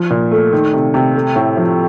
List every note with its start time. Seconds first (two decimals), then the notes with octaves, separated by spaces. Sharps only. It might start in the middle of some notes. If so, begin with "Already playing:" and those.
Already playing: F3
0.10 A#2
0.31 A3
0.52 D#3
0.73 C3
0.94 C3
1.15 A3
1.36 A2
1.57 F3